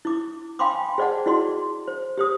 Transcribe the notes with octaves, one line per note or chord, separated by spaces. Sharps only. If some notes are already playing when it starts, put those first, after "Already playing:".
E4 D6
F5 G5 G#5 B5 C6 D6
G#4 C5 D5 D#5 F#5 A5
E4 F#4 G#4 D5 C6
C5
G4 C5 D#6